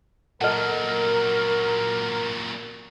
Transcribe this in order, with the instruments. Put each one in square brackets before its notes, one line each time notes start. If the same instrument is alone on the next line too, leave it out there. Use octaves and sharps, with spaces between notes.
[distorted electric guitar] A#2 F#3 [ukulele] A4 D#5 [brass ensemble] A#4 [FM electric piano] F#5 F6